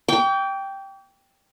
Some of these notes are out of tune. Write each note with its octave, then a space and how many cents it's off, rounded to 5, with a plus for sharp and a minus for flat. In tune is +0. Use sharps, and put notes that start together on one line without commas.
G5 +0 D6 -45